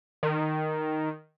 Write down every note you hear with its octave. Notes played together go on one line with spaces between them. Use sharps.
D#3